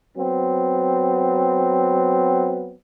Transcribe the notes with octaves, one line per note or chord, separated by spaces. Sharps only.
F#3 B3 C4